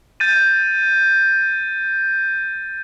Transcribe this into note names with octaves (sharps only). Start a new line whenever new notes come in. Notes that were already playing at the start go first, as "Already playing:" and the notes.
G6 A6 D#7